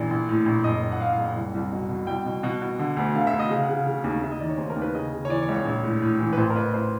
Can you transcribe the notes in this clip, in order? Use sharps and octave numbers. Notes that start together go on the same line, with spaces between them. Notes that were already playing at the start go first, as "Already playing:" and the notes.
Already playing: A#1 E3 D5
A#1
A2
A#1
F#1 D#5
F#1
F#5
F#1 F5
F#1 F5
F#5
C2
C2
B2
B2
C2 G5
B2
B2 F#5
B2
D3
D2
D3 F5
E5
D2
D#5
C#3 F5
F#5
C#3
F5
C#3
D#2
D#2 E5
D#5
D#3 D5
C#5
D#2 C5
A#4
D#2
B4
C#3 D#5
C#3
C#5
E3 D5
C#5
C#2
C#5
A#1
A2
A2
E3
B4
A1 C5
A#4
A1 B4
A1 C5